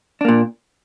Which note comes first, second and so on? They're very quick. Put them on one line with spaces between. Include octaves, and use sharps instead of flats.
D4 A#3 A#2